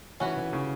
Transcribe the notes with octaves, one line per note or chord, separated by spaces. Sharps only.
E3 C#4 F#4 B4
E3
C#3